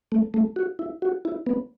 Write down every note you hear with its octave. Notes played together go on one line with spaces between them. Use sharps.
A3
A3
F#4
E4
F#4
E4
B3